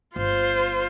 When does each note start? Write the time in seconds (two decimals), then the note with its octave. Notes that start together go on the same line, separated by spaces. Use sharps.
0.16 G1 F4 C5